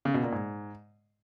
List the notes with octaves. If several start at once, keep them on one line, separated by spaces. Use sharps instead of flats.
C#3
B2
A#2
G#2